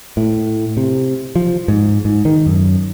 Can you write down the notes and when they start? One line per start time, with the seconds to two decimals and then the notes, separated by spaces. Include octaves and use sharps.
0.17 A2
0.77 C3
1.36 F3
1.68 G#2
2.05 G#2
2.25 D#3
2.46 F#2